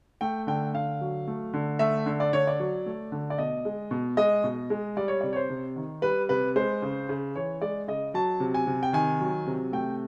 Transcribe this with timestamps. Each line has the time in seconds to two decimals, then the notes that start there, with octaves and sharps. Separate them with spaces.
0.21 A3 G5
0.47 D3 G5
0.74 D3 F5
1.01 F#3
1.27 A3
1.54 D3
1.79 A3 E5
2.06 D3
2.20 D5
2.33 D3 C#5
2.47 D5
2.60 F#3
2.86 A3
3.12 D3
3.30 D5
3.38 B2 D#5
3.65 G#3
3.91 B2
4.17 G#3 D#5
4.44 B2
4.70 G#3
4.97 G3 D5
5.08 C#5
5.21 C3 D5
5.33 C#5
5.36 C5
5.50 C3
5.76 D#3
6.02 G3 B4
6.29 C3 B4
6.56 G#3 C5
6.82 C#3
7.09 C#3
7.35 E3 C#5
7.61 G#3 D5
7.88 C#3 D#5
8.14 F#3 A5
8.40 C3
8.54 G#5
8.67 C3
8.83 G5
8.93 D#3 G#5
9.20 F#3
9.47 C3
9.72 A3 G5